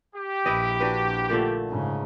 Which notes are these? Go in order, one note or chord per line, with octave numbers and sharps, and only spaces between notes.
G4
A#1 E4 B4 D#5
D4 F#4 B4
A#2 D3 A3
G#2 C#3